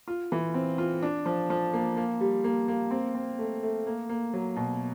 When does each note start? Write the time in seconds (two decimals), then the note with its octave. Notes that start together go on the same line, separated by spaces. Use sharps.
0.08 F4
0.32 E3
0.54 C4
0.78 F4
1.02 D4
1.26 F3
1.50 F3
1.73 A#3
1.97 A#3
2.21 G3
2.44 A#3
2.68 A#3
2.91 C4
3.15 C4
3.39 A3
3.63 A3
3.87 A#3
4.09 A#3
4.33 F#3
4.56 B2